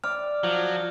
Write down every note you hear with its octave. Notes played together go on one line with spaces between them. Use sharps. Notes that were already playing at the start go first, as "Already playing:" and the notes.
D5 D6 F6
F3 F#3